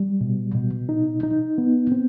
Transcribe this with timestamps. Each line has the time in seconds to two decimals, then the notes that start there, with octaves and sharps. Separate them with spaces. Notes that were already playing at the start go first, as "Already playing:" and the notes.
Already playing: G3
0.21 B2
0.55 B2
0.89 D#4
1.23 D#4
1.58 B3
1.92 C4